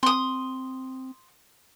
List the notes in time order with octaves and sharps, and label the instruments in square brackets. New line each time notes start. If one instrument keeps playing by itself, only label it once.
[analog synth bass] C4 [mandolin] C6 D#6